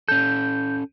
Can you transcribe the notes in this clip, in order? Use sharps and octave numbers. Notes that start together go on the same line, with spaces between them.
C#4 A4 G6